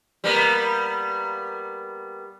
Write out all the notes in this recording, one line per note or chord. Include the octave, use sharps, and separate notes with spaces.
G3 A#3 B3